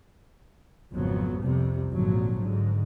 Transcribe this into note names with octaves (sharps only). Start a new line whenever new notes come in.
G#1 F2 C#3 F3 F#3 B3
C2 F2 C3 G3
G#1 A#2 D3 F3 F#3
G#2 D3